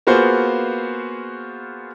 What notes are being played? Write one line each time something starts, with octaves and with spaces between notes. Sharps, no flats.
A#3 B3 F4 F#4 G#4 C5